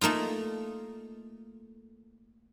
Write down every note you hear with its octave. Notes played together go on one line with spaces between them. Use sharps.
A3 A#3 D#4 F4